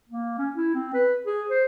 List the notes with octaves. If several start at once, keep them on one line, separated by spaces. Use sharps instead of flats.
A#3
C#4
E4
C4
B4
G#4
C5